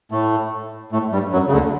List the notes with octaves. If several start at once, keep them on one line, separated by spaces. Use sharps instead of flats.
A2 A3
A2 A3
G2 G3
F#2 F#3
C#3
D2 D3